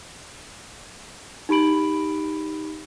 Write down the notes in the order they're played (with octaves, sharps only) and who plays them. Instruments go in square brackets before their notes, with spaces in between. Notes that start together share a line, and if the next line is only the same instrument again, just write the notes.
[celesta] D#4 G4 B5 D7 F#7